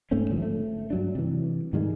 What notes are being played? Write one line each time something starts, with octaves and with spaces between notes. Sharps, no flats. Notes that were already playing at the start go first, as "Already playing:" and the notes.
G#2 A3 C4 C#4
G#1 D3 F3
A3
G2 F#3 D4
C3 E3
G#2 D#3 G3 G#3